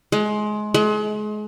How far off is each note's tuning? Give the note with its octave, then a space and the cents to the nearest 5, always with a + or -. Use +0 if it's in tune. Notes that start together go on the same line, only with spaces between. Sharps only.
G#3 +25
G#3 +35